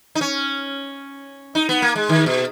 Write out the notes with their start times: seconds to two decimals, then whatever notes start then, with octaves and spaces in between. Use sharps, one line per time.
0.15 D#4
0.21 C#4
1.55 D#4
1.69 B3
1.82 A#3
1.96 G#3
2.09 D#3
2.26 B2